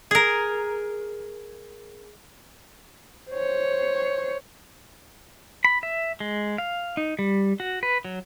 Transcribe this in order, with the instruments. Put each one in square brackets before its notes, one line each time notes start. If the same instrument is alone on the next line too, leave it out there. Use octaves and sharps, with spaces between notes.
[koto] G#4 A#4
[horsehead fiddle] C5 C#5
[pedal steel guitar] B5
E5
G#3
F5
D#4
G3
F#4
B4
F#3